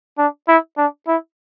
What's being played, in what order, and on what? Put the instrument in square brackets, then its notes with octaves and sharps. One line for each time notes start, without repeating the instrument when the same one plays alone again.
[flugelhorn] D4
E4
D4
E4